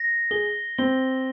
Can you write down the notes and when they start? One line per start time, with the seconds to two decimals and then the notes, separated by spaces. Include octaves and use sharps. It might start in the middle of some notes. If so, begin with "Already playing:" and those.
Already playing: A#6
0.31 G#4 G7
0.78 C4 G7